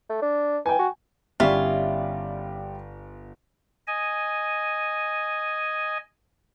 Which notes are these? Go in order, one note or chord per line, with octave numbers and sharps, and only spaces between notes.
A3
D4
E3 G5 G#5
F#4
G1 G3 C#4 E4 F4 D5 E5
D#5 G#5